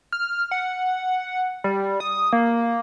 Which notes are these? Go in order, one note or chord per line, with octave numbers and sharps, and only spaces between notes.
F6
F#5
G3
D#6
A#3